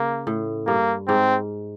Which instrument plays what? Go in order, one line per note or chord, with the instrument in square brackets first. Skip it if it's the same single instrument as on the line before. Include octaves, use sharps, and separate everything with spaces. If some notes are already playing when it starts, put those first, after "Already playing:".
Already playing: [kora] C#3 [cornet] A#3
[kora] A2
[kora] G2 [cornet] A#3
[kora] G#2 [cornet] C4